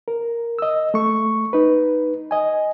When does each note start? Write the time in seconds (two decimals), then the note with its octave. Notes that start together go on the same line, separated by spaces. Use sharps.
0.08 A#4
0.59 D#5 E6
0.94 A3 C#6
1.53 D#4 B4
2.31 D#5 G#5